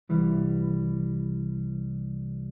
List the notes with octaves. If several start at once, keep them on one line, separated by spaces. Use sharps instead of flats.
C2 E3 G3